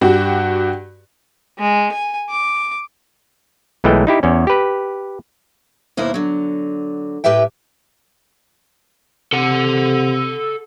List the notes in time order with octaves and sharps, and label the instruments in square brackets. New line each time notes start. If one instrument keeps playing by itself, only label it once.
[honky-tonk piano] G2 F#4 G4
[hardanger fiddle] G#3
G#5
D6
[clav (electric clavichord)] B1 E3 G#3 A3 G5
D#4 E4 G4
E2 C#4
G4 B4
[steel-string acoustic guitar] D#2 B2 A#3 E4 C5
D3 F#3
A2 G4 B4 E5 G5
[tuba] C3 [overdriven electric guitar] A4 F#5